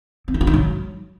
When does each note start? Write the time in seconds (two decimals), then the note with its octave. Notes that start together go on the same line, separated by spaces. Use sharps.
0.28 C4
0.34 E4
0.41 F4
0.47 D#4
0.54 F#3